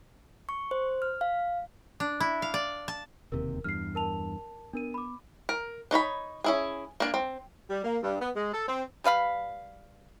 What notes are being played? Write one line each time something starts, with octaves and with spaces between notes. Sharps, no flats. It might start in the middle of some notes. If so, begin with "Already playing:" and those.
C#6
C5
F6
F5
D4
E4
F5
D5
A5
E1 D#2 C3 A#4
E2 G2 F6 C7
A#4 A5 F7
B3 D4 A#4 D#7
B5 D6
A#4
D4 D#4 C#5 B5
C#4 E4 G#4
A#3 D4
C4
G3
A#3
G2
B3
G#3
A4
C4
G3 B4 F5 B5